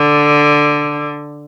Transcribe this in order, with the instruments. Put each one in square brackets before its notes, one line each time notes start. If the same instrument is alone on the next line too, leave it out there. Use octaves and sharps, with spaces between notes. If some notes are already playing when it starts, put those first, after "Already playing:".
Already playing: [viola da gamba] D3